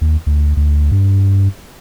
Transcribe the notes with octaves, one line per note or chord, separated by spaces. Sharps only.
D#2
D2
D2
G2